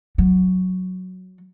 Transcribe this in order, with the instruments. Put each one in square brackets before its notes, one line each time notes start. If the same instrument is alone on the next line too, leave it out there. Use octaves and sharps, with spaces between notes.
[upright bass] F#3